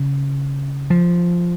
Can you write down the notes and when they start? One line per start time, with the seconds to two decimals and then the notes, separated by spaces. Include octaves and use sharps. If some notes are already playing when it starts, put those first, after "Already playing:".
Already playing: C#3
0.90 F3